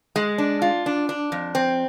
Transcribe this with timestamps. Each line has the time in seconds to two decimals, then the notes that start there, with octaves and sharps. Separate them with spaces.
0.16 G#3
0.38 D4
0.62 F4
0.86 D4
1.09 D4
1.32 F2
1.55 C4